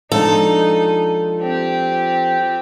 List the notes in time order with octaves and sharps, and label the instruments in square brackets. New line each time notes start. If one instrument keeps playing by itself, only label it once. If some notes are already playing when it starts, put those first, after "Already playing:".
[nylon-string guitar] F3 G#3 D4 [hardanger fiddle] D#4 [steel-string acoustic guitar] A4
[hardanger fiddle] C4 G4